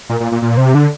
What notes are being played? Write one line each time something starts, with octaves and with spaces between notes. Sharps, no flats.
A#2
A#2
A#2
A#2
C3
D3